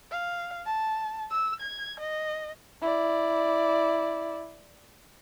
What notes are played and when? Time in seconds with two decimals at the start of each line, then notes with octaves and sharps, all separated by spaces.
0.11 F5
0.66 A5
1.31 E6
1.60 G#6
2.00 D#5
2.82 E4 D5